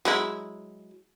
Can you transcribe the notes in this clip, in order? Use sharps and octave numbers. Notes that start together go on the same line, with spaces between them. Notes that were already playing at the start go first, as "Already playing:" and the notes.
F#3 G#3 E4